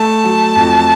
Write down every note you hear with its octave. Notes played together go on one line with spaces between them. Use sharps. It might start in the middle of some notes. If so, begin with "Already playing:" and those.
Already playing: A3 A5
F#3
F2